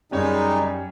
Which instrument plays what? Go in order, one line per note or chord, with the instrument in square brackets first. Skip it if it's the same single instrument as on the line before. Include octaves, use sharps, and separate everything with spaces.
[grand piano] F#2 C#5 [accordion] C#3 G#3 D#4 [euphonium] G3